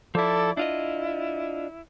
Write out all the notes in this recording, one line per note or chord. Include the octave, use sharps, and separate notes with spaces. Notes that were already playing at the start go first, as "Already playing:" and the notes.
F3 E4 A4 D5 D6
D4 E4 F4 D#5